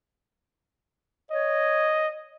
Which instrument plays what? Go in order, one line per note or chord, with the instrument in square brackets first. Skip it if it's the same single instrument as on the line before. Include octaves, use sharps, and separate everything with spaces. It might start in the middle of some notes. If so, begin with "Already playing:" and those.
[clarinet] C#5 [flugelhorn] D#5